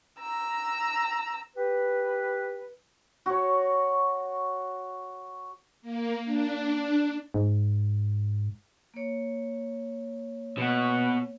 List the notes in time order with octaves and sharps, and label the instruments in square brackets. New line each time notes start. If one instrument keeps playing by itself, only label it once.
[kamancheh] A#5 E6
[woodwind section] G4 B4
[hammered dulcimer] F#4 C#5
[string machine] A#3
D4
[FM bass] G#2
[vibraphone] A#3 C#5
[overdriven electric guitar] B2 F#4